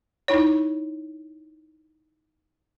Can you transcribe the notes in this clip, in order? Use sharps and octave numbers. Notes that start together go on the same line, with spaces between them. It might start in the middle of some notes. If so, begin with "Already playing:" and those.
D#4 E4 C#5